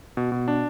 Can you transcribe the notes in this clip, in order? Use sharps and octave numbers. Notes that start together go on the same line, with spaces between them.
B2
B2
D4